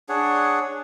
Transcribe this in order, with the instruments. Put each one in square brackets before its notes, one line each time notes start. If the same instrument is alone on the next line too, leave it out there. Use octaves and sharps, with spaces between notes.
[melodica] D4 G#4 C#5 F#5